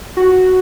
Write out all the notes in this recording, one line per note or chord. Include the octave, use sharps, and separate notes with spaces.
F#4